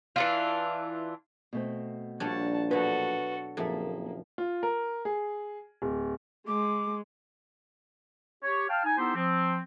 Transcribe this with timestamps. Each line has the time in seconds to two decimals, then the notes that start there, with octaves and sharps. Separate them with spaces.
0.16 E3 D4 F4
1.53 B2 A3 C4
2.20 A#1 G3 D4 F#4 C#5 A5
2.71 B2 F#3 F#4 A4 B4
3.57 F#1 F2 A#2 A#3 G#4 A4 E5
4.38 F4
4.63 A#4
5.05 G#4
5.82 D1
6.47 G#3 D6
8.44 G4 C#5
8.69 F5 G5 A5 F6
8.85 D#4 G#5
8.98 B3 D#4 E4 G4 A4 C5
9.16 F3 C4